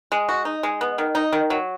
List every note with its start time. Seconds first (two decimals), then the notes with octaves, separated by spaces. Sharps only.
0.12 G#3
0.29 F#4
0.45 D#4
0.63 G#3
0.81 B3
0.98 D#3
1.15 D#4
1.33 D#3
1.50 F#3